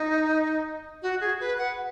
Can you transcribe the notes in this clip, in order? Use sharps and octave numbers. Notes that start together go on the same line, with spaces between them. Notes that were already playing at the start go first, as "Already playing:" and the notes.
Already playing: D#4
F#4
G#4
B4
F#5